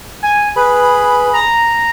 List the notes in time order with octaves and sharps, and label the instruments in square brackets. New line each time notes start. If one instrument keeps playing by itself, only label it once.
[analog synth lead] G#5
[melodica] G#4 B5 [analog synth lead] B4
[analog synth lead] A#5